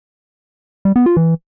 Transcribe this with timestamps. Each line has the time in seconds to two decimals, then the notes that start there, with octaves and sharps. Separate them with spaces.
0.85 G3
0.96 B3
1.06 F4
1.17 E3